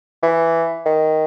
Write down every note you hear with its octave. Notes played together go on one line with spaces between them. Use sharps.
E3
D#3